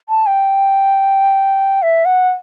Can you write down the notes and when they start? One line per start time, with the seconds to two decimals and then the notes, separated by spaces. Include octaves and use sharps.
0.09 A5
0.26 G5
1.82 E5
2.05 F#5